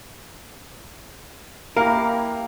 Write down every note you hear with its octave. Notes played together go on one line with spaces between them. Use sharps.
A#3 E4 G4 A#4 F5 A#5